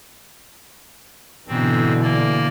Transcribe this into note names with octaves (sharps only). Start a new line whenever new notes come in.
G#2 B2 D3 E3 C4
A#3 D5